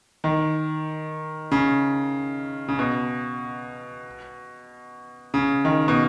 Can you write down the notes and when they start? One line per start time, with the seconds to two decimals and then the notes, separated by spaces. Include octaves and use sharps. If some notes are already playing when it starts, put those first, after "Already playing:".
0.24 D#3
1.52 C#3
2.68 C#3
2.79 B2
5.34 C#3
5.65 D#3
5.88 B2